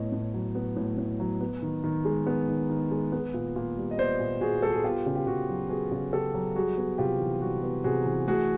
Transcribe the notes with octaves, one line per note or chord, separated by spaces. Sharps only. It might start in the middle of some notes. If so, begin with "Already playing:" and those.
Already playing: A2 B3 C#5 D#5
A2
F#3
B3
A2
A2
F#3
B3
D#3
D#3
G#3
B3
D#3
D#3
G#3
B3
A#2
A#2
G3
D#5
B3 C5 D5
A#2
A#2 F#4 G#4
G3 A4
G#4
B3 F4 G4
C#3
G4
C#3 F#4
F#3
B3 F#4 G#4
C#3
C#3 G4 A4
F#3
G3 F#4 G#4
B3
C3 F4 G4
E3
G3 F#4
B3
C3 F#4 G#4
E3
A3 F#4 G#4